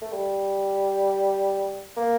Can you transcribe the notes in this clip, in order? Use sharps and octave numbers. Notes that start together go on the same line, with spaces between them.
A3
G3
A#3